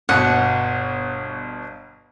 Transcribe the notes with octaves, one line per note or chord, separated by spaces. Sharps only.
G1 B2 F#5